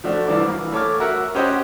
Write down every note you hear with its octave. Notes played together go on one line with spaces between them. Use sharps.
F3 A3 D4 F#4
C2 E3 D4 D6
E3 A#3
A3 C#5 D6 F6
F#4 A#4 E5 F#5
C#4 G4 C5 D#5 F#5